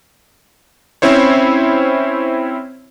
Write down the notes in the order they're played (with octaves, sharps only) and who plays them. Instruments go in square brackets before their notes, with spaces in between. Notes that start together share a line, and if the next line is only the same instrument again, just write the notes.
[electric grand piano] C4 C#4 E4 C5 C#5